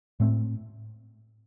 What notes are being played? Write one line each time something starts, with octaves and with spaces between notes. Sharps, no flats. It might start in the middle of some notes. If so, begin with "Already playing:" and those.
A2 A3 C4